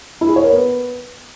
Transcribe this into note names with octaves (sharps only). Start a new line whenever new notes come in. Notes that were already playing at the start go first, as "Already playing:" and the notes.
E4
G#4
C#5
A#4
B3